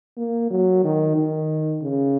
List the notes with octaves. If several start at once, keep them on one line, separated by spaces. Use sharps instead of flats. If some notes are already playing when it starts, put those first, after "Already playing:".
A#3
F#3
D#3
D#3
C#3